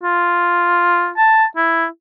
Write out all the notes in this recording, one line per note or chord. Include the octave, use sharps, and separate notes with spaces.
F4
A5
E4